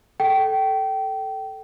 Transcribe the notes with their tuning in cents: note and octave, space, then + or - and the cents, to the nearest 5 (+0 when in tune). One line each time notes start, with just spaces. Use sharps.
A4 +0 G5 -25